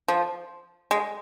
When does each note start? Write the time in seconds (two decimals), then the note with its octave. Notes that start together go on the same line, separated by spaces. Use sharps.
0.08 F3
0.91 G#3